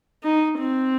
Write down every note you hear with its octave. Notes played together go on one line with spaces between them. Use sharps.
D#4
C4